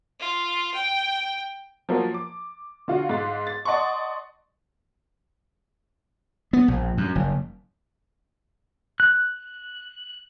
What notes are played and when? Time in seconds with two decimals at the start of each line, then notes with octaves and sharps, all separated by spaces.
0.19 F4
0.74 G5
1.89 F3 F#3 A#3
2.14 D6
2.88 D3 F4 F#4
3.09 G#2 F5 A6
3.47 A6
3.65 D5 D#5 F#5 A5 C6 C#6
6.53 B3
6.68 A#1
6.98 F#2
7.15 F#1
9.00 F#6